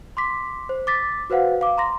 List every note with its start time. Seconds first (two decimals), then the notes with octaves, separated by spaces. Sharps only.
0.17 C6 D6 B6
0.69 C5
0.87 D6 A6 B6
1.30 F#4 B4 C5 F5 F#5
1.61 F5 D6
1.78 A#5 C6 A#6